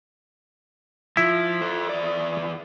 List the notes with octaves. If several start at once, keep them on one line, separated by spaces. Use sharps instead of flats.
F3 E4
A4 C5
E2 D5